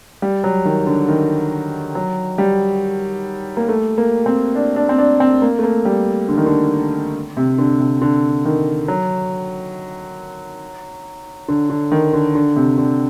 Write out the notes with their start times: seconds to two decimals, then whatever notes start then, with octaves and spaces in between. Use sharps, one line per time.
0.22 G3
0.44 F#3
0.65 D#3
0.87 D3
1.09 D#3
1.95 F#3
2.38 G3
3.57 A#3
3.68 A3
3.98 A#3
4.26 C4
4.55 D4
4.76 D4
4.89 C4
4.98 D4
5.20 C4
5.42 A#3
5.59 A3
5.63 A#3
5.85 G3
6.29 D3
6.37 D#3
6.46 D3
7.37 C3
7.58 D3
7.80 C3
8.02 D3
8.45 D#3
8.88 F#3
11.48 D3
11.70 D3
11.92 D#3
12.13 D3
12.35 D3
12.56 C3
12.78 D3